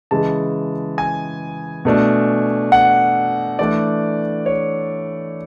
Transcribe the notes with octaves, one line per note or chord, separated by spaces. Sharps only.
C#3 E3 G#3 A5
G#5
B2 A3 D4
F#5
E3 A3 D4 D5
C#5